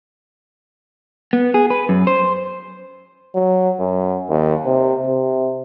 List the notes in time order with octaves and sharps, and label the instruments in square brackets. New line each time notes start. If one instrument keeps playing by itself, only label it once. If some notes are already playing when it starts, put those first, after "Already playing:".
[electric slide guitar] B3
G#4
B4
F#2
C5
[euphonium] F#3
F#2
D#2
C3
C3